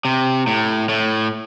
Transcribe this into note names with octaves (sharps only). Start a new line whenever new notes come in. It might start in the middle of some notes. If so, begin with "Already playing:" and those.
C3
A2
A2